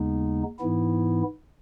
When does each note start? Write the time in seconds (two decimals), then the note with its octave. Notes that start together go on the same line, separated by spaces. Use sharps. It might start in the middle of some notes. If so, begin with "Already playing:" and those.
Already playing: D#2 C#3 G#3 B3 D#4
0.59 G#2 E3 B3 E4